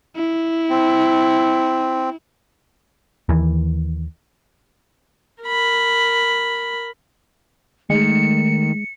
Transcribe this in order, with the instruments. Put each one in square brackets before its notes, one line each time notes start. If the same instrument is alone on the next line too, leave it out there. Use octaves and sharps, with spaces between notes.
[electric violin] E4
[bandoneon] C4
[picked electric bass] D#2 E3
[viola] A#4 B5
[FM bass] D#3 [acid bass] G#3 [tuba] A3 [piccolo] C#7